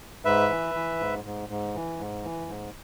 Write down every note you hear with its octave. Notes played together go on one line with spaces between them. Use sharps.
G#2 B4 E5
E3
E3
G#2
G#2
G#2
E3
G#2
E3
G#2